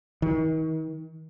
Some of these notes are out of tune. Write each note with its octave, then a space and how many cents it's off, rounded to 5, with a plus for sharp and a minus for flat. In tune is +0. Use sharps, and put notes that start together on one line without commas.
D#3 +40